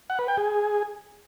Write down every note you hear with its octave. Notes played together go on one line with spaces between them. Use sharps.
F#5
B4
G5
G#4